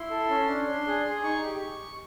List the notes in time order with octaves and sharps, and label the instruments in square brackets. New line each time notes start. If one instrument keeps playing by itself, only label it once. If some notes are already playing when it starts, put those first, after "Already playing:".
Already playing: [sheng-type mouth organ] E4 C6
A4
C#4
D4
D4
G#4
G#4
D#4 C#6
G4